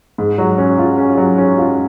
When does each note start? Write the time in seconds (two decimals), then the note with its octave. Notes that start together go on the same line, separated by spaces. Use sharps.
0.18 G#2
0.38 F#3
0.58 C#4
0.78 F4
0.98 C#4
1.17 F#3
1.38 C#4
1.58 F4